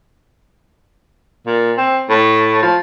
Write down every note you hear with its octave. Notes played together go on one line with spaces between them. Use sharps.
A#2
C4
A2
F3